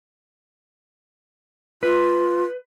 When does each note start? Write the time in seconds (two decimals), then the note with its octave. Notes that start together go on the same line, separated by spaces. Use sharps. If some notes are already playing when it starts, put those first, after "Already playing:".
1.83 F4 B4